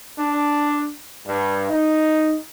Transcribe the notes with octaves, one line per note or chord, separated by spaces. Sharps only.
D4
G2
D#4